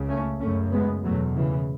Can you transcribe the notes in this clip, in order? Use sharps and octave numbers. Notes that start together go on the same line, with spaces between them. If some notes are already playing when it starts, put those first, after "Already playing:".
Already playing: C#2 C#3
A3 C#4
F#2 C#3 A3 C#4
G#3 B3
E2 B2 F#3 A3
C#3 E3